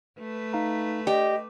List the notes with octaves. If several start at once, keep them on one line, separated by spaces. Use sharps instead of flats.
A3 B4
D#4 F5 A#5
G4 D5 D#5